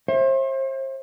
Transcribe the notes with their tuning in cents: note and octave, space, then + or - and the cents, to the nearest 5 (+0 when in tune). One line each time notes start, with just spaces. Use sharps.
C5 +35 E5 +0